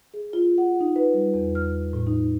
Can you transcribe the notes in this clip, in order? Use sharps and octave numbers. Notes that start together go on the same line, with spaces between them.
G#4
F4
F#5
D#4
B4
G3
E2
F6
A2
D#4